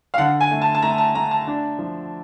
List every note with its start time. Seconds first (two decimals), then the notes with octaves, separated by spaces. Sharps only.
0.14 F5
0.18 D3 F#5
0.41 G#5
0.51 A3
0.62 A5
0.75 A5
0.82 A3 A#5
0.98 A5
1.15 A3 A#5
1.31 A5
1.47 D4
1.79 F3